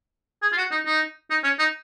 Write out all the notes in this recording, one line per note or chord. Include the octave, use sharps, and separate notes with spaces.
G#4
F4
F#4
D#4
D#4
D#4
C#4
D#4